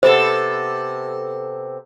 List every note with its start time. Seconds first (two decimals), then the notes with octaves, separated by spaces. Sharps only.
0.03 C3 B3 A4 C5